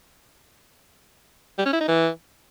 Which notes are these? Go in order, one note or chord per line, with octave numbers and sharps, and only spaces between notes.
G3
C#4
E4
D#4
E3